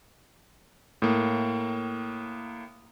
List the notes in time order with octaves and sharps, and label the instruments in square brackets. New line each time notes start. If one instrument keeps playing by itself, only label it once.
[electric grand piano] A2 A#3